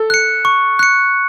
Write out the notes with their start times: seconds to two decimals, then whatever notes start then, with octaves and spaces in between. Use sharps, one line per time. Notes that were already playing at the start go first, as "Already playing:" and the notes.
Already playing: A4
0.10 F#6 C#7
0.45 C#6
0.79 F#6 C#7